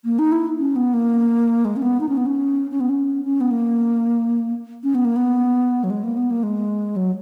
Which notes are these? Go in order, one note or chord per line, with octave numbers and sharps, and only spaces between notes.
A#3
D#4
E4
C#4
B3
A#3
G#3
C#4
B3
D#4
C#4
B3
C#4
C#4
B3
C#4
C#4
B3
A#3
C#4
B3
A#3
B3
F#3
G#3
A#3
B3
A#3
G#3
F#3